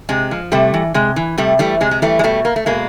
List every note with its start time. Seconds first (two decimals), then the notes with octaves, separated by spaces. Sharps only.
0.09 C3 G#3
0.31 F3
0.52 C3 G3 A3
0.74 E3
0.94 C3 G#3
1.16 E3
1.38 C3 G3 A3
1.59 E3 G3 A3
1.81 C3 G#3
1.91 G#3
2.02 E3 G3 A3
2.19 G#3
2.24 B2 G3 A3
2.45 A#3
2.56 A3
2.66 B2 G#3 A#3